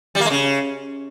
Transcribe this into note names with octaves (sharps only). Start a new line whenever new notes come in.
G3
A#3
G#3
C#3